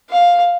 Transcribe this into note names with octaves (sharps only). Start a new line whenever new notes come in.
F5